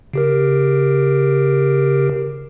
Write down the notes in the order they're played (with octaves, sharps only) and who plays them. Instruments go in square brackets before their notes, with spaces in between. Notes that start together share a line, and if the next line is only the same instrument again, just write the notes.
[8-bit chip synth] C#3 G4 A#4